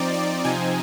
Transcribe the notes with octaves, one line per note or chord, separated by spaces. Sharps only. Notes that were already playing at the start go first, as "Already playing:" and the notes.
Already playing: F3 C4 D#4 D5
D5
C3 F3 C4 D#4 G#5